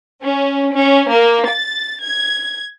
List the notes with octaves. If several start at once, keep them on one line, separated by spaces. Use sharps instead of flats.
C#4
C#4
A#3
A6
G#6